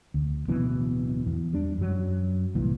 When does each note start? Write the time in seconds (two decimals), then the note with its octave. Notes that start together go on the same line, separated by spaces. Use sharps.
0.14 D2
0.48 D1 B2 E3
1.27 E2
1.53 G3 D4
1.78 F#2 F#3
2.55 C2 A#2 E3